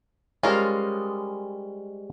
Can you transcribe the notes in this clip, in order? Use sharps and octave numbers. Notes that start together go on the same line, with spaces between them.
G3 G#3 C#4 F4 A#4 C5